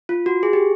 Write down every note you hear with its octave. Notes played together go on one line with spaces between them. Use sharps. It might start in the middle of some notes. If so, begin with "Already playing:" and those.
F4
F#4
G#4
G4